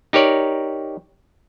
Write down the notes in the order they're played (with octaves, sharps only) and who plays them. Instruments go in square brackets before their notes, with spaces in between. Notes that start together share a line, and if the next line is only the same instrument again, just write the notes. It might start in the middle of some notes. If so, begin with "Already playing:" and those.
[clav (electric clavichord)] D#4 G4 A#4 C#5 D5